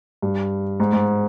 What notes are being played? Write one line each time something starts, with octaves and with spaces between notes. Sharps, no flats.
G2
G#2
G#2